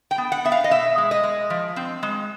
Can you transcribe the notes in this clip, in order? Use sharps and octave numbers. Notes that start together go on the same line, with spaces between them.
G5
B3
F#5
B3 E5
F5
D#5
B2 E5
G#3
D#5
G#3
F3
C4
G#3